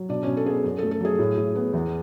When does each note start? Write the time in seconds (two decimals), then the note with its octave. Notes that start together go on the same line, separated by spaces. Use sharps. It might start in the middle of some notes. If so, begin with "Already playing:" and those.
Already playing: F#3
0.09 B2 D4 D5
0.23 B2 C#4 C#5
0.37 A4
0.45 B3 G#4
0.50 A4
0.65 F#2
0.78 A4
0.83 A3
0.91 A4
1.01 F#3 G#4
1.19 A2
1.38 A2
1.55 B3
1.73 E2